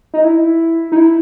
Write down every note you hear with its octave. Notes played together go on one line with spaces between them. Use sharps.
D#4
E4
D#4
E4